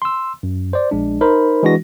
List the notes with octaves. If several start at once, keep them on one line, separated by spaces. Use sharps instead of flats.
C6 E6
F#2
C5 D5
A#1 G#3 D4
D#4 A#4 C5 B5
E3 G#3 D4 F#4 A#6